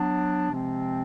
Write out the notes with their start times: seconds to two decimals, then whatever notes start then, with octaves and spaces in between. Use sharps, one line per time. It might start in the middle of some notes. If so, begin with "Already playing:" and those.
Already playing: F#3 B3 D4
0.50 C3 F3 G#3 C4